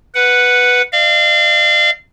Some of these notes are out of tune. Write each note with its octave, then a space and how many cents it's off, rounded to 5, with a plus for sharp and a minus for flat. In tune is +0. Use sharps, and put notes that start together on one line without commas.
B4 +0 F#5 -5
D5 +45 F5 -25